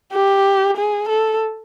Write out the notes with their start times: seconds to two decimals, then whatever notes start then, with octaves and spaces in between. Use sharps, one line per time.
0.12 G4
0.77 G#4
1.08 A4